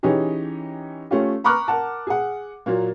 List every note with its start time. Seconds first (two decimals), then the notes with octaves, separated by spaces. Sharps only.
0.03 E3 C#4 D#4 G4 G#4
1.11 A3 C#4 F4 G4
1.44 A#5 B5 C#6 D6 F6 F#6
1.68 A#4 F#5 A5
2.07 G#4 F#5
2.66 A#2 F#3 A#3